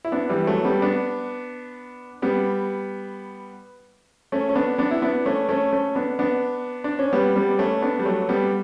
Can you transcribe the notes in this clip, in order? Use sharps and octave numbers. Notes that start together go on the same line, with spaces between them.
E4
B3 D4
E3 G3
F#3 A3
G3 B3
B3 D4
G3 B3
A3 C#4
C#4
B3 D4
B3 D4
E4
B3 D4
A3 C#4
A3 C#4
A3 C#4
B3 D4
B3 D4
D4
C#4
G3 B3
G3 B3
A3 C#4
B3 D4
G3
F#3 A3
G3 B3